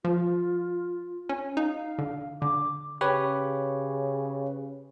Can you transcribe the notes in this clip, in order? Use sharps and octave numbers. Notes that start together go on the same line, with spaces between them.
F3 F4
C#4
D#4 F5
D3
D3 D6
C#3 G4 B4 C#5